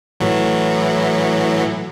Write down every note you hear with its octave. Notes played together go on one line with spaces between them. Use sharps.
A2 E3 F#3